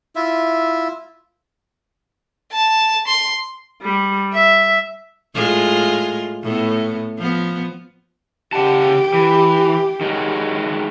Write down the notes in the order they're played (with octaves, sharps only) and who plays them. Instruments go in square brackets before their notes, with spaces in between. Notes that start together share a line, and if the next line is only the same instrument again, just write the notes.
[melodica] E4 F4 E5
[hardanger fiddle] A5
C6
[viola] G3
E5
[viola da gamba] A2 G#3 F4
A2 B3
F3 B3
[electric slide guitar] C#3 F#5 A5 [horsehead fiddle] G4
[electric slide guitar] E3
D#3 F#3 G#3